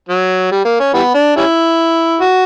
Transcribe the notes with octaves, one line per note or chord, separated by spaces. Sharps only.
F#3
G3
A#3
C#4
E3 G3 B3
D4
G3 C#4 E4
F#4